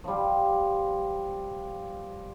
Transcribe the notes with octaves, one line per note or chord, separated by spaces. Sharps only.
F3 G3